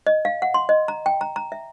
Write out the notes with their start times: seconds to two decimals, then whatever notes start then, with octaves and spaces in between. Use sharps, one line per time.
0.07 D#5
0.25 F5
0.42 F#5
0.54 C6
0.69 D#5
0.88 A#5
1.06 G5
1.21 A#5
1.36 A#5
1.52 E5